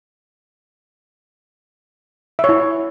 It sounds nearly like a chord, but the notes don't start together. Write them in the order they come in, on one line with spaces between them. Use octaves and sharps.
E5 C#5 E4